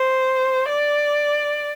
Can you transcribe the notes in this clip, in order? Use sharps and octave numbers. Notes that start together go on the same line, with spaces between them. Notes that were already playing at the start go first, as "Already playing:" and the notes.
Already playing: C5
D5